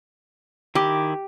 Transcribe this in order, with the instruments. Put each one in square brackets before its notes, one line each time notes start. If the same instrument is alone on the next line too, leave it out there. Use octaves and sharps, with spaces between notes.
[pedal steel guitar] D#3 E4 D6 [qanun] G4